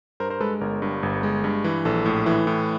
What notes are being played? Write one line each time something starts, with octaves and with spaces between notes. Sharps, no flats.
G2 A#4 C5
A#4 C5
G#3 A4 B4
G1 A#4
G2
G1
G#3
G2
E3
A#1 A4
A2
E3
A2